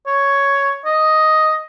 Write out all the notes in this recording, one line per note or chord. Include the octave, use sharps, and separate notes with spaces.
C#5
D#5